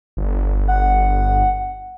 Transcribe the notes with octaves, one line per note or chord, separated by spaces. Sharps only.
G1
F#5